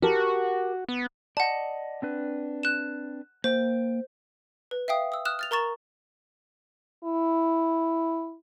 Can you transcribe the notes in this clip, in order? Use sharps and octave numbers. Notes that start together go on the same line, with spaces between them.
F#4 G4 A#4 A5
B3
D5 D#5 F#5 A5
C4 D4 B4
F#6 E7
A#3 C5 G5
B4
E5 F5 G5 D#6
D#6 E6
D#6 F6 F#6 E7
F6 A6 F7
A#4 A#5 C#6 A6 E7
E4